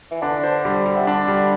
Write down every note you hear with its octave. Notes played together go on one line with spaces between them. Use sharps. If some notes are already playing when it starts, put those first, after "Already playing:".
E3
D3 D4
C5
G3
G3
C3
D3 D4
G3